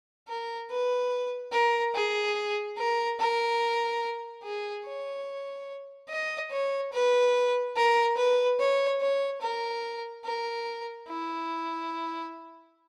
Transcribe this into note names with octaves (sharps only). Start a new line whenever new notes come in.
A#4
B4
A#4
G#4
A#4
A#4
G#4
C#5
D#5
C#5
B4
A#4
B4
C#5
C#5
A#4
A#4
E4